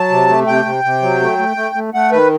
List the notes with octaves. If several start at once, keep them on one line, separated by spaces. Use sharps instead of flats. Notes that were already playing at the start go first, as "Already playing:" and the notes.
Already playing: F#3 A5
C3
A3
C3 G5
C3
C3
F#3
A3
A3
A3
A3
A3 F#5
D#3 B4